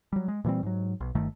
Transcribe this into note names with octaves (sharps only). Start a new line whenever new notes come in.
F#3 G3
G#3
A#2 E3 G3 C4
G#2 F#3
B1
G1 G2 D#3 A3